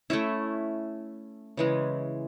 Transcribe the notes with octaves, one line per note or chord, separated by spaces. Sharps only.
A3 C#4 E4
C#3 E3 G#3